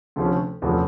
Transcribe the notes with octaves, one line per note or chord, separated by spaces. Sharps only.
D2 C3 F3 A3 C#4
E2 C3 F3 A3 C#4